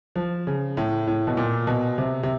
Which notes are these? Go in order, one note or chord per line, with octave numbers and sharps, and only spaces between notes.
F3
C#3
A2
A2
B2
A#2
B2
C3
C3